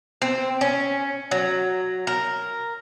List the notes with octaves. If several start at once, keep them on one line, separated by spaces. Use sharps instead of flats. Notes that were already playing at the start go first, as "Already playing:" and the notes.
C4
C#4
F#3
A#4